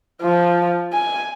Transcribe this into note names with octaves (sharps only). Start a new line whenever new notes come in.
F3
G#5